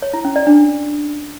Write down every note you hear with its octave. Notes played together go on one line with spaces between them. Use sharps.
C#5
E4
C#4
D5
D4